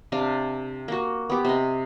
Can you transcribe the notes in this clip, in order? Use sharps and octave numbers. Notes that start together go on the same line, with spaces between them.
C3 D4 F5
A#3 F#4
B3 G4
C3 D#5